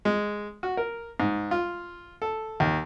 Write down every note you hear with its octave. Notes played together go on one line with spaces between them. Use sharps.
G#3
F#4
A#4
G#2
F4
A4
D#2